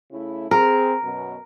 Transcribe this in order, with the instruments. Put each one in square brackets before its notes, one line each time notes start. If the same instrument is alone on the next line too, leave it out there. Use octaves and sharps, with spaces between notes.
[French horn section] C#3 A3 E4
[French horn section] C4 G#4 [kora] A#4
[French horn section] F#2 B2